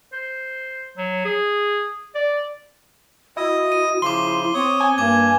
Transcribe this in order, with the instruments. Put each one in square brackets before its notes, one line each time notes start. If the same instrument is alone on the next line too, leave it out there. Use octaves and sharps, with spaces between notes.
[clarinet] C5
F#3
G#4
D5
[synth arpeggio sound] E4 [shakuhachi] F#4 [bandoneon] D#5 D#6
[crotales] D#7
[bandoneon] C#3 F3 [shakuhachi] E4 [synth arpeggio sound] C6 [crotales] D6 G7
[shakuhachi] C4 [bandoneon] C#5 D#6
[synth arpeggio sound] G#5
[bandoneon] G2 [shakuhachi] A#3 [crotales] D6 G#6